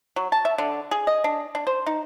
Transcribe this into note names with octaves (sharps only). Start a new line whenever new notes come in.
F#3
A5
E5
D3
G#4
D#5
D4
D4
C5
D#4